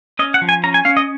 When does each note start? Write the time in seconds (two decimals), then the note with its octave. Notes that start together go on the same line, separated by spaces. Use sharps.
0.19 C#4 D#5
0.34 F#5
0.42 F3
0.49 G#5
0.64 C#4 A#5
0.74 G#5
0.85 C#4 F5
0.97 D#5